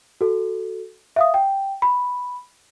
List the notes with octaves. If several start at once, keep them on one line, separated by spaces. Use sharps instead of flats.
F#4 A4
E5 F5 D#6
G5
B5